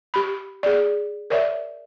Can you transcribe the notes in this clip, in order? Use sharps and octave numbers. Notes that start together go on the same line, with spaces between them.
G4 B5
G#4 D5
A#4 C#5 D5 E5